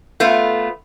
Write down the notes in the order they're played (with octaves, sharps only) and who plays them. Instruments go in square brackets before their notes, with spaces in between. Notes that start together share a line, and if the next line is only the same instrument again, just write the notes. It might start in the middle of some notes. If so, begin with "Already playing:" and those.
[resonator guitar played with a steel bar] A3 B3 F4